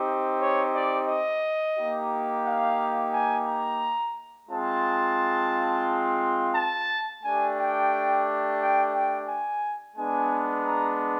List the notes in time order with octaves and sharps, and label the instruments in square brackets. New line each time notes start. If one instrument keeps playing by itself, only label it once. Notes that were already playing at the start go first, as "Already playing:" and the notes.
Already playing: [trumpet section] C4 D#4 G4
C#5
D5
D#5
A#3 D#4 G4
F5
G#5
A#5
G#3 C4 F4 A5
A5
A3 D4 G4 G#5
G5
G5
G5
G#5
G#3 B3 D4 G#5
A#5